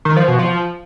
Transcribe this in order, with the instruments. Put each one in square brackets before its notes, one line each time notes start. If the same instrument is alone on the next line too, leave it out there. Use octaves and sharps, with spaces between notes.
[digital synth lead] D#3
F3
B2
F3